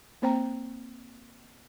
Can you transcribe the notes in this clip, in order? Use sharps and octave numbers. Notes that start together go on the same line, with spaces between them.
A#3 C4 C5 G5 A#5